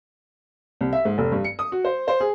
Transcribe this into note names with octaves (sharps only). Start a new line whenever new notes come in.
C2
E5
G#2
F1
G2
C#7
D#6
F#4
C5
C5
G#4